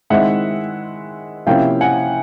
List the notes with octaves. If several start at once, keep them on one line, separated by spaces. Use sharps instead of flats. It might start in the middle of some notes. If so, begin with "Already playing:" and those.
D#3 G#3 C4 E4 E5 F#5
C3 F3 A#3 C#4 E4 F5 G5
F#5 G#5